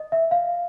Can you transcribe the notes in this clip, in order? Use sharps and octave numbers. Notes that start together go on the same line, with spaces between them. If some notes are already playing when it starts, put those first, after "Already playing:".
Already playing: D#5
E5
F5